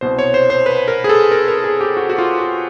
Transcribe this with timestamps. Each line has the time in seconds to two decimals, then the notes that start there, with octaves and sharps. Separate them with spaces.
0.01 C2 B2 C5
0.19 C#5
0.34 C5
0.50 C5
0.66 B4
0.88 A#4
1.04 G#4
1.09 A4
1.32 A#4
1.48 A#4
1.64 G#4
1.81 G4
1.97 F#4
2.10 F#4
2.18 F4
2.39 F#4